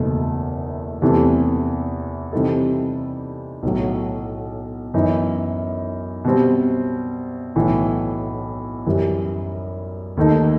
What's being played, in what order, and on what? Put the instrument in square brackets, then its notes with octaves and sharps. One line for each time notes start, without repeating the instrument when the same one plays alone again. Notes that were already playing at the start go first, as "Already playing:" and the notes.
Already playing: [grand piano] F#1 E2 B2 A3 D#4
E2 C3 E3 A3
C3 E3 G3 D#4 A4
B1 A2 F#3
F#2 E3 B3 D#4
B2 G3 C4
B1 A2 E3
F#2 E3 G3
D#2 D#3 A3 D#4